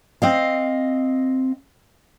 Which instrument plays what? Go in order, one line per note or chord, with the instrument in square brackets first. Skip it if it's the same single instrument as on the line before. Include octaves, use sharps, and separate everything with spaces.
[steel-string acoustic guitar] C4 D#5 F5